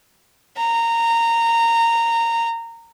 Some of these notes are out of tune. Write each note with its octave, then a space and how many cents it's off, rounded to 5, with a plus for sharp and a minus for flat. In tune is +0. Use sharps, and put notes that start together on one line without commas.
A#5 -15